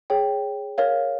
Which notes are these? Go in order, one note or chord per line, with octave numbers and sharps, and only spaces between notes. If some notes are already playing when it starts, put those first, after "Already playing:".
G#4 C#5 G5
A#4 C#5 F5